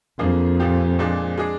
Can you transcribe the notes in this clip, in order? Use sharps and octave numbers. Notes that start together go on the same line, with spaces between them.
F2 D3 F3 A#3 F4 G#4
A#2 F3 C4 G4
A#2 F3 G#3 D4
G#3 D4 G#4